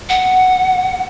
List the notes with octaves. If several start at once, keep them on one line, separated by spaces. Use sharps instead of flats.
F#5